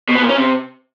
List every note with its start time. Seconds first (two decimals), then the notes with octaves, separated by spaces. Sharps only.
0.09 B2
0.15 B3
0.22 A#2
0.29 C#4
0.36 C3